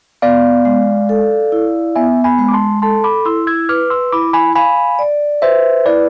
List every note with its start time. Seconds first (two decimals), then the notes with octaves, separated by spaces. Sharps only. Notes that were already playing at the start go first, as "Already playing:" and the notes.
0.22 B3 D5 F5
0.65 G#3
1.09 A4
1.52 E4
1.96 B3 E5 G#5
2.24 G#5 B5
2.38 G#3
2.48 D6
2.53 A5 C6
2.82 A4 A5 C6
3.04 B5 D6
3.25 E4 C6 E6
3.47 E6 G#6
3.69 B4 D6 F6
3.90 C6 E6
4.12 E4 B5 D6
4.33 G#5 B5
4.55 F5 G#5 B5
4.99 D5
5.42 B4 C5 E5
5.86 E4 B4 D5